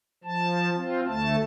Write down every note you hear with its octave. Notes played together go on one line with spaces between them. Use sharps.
F3 A5
C4 F4
D2 A3 A5